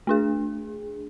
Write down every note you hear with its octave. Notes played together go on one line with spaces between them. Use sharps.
A3 D4 G#4